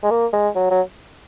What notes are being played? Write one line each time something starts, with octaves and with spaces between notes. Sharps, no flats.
G#3
A#3
G#3
F#3
F#3